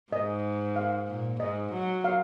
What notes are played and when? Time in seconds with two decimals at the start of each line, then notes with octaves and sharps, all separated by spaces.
0.13 G#2 D#5
0.76 F5
1.08 A#2
1.40 G#2 D#5
1.72 F#3
2.04 F5